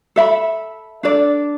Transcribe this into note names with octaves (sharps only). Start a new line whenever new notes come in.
A4 E5 B5
D4 A4 D5